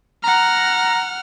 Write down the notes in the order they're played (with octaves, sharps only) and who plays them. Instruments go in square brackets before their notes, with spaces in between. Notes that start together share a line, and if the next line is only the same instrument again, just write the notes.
[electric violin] F#5 F6 [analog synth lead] A#5